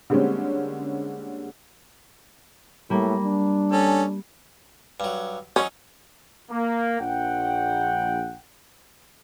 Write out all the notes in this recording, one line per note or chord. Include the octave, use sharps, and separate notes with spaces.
D3 G3 G#3 A#3 C4 C#4
A2 G3 A#3
D4
C#4 A4
G2 F#3
F#3 C#4 D#4
A#3
A#1 F#5 G5